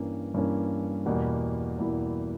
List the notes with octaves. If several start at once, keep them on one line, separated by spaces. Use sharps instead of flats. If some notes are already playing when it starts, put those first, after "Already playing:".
Already playing: G2 E3 A#3 C#4
G2 E3 A#3 C#4
E2 B2 G3 A#3 E4
E2 B2 G3 A#3 E4